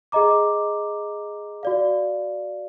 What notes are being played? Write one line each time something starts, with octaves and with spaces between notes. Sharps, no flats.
G#4 D#5 A#5 D6
F#4 D5 F5